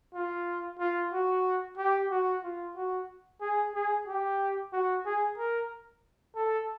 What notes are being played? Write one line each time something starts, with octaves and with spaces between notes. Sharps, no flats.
F4
F4
F#4
G4
F#4
F4
F#4
G#4
G#4
G4
F#4
G#4
A#4
A4